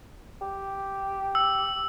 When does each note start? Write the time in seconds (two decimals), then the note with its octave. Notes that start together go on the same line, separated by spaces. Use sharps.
0.41 G4
1.35 E6